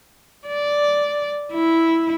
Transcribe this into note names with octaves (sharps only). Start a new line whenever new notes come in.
D5
E4